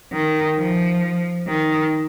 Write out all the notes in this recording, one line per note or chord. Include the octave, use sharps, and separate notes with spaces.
D#3
F3
D#3